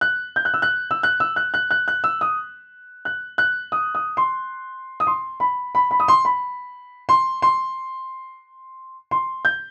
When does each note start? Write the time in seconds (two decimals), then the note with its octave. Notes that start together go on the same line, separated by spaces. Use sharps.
0.01 F#6
0.36 G6
0.45 F#6
0.54 E6
0.62 F#6
0.91 E6
1.03 F#6
1.20 E6
1.36 F#6
1.54 F#6
1.71 F#6
1.88 F#6
2.04 E6
2.21 D#6
3.05 F#6
3.38 F#6
3.72 D#6
3.95 D#6
4.17 C6
5.00 D#6
5.07 C6
5.40 B5
5.75 B5
5.91 B5
6.00 D#6
6.08 C6
6.25 B5
7.09 C6
7.42 C6
9.11 C6
9.45 G6